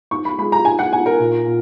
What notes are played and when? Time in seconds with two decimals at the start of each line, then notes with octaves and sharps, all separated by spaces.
0.11 G#2 C#6
0.25 B5
0.39 G#3 B5
0.52 A#5
0.65 G#2 G#5
0.79 F#5
0.93 G#2 G#5
1.06 A#4
1.20 A#2
1.46 A#2